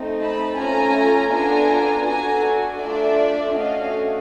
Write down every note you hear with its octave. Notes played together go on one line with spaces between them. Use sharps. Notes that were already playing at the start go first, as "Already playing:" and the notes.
Already playing: A3 C4 D#4
A5 B5
A3 C#4 F4 A4 G#5 A#5
B3 D4 F4 A4 G#5 A#5
D4 F#4 A4 G#5 A#5
A3 D4 F4 A4 D5 E5
A3 C#4 F#4 A4 D#5 F5